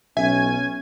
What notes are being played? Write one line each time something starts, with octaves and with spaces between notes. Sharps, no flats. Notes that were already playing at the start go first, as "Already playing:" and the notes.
B1 C#4 E5 G#5